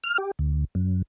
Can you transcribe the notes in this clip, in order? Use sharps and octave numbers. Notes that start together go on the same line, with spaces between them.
F6
G4
D2
F#2